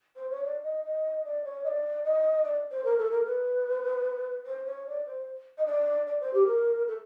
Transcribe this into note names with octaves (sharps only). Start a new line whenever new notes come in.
C5
C#5
D5
D#5
D#5
D5
C#5
D#5
D5
D#5
D5
C5
A#4
A4
A#4
B4
C5
C#5
D5
C5
D#5
D5
D5
C5
G4
A#4
A4